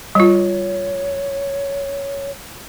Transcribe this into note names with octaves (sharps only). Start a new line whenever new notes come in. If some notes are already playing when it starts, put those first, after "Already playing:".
G3 F4 C#5